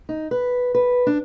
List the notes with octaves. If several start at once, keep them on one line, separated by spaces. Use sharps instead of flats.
D#4
B4
B4
D4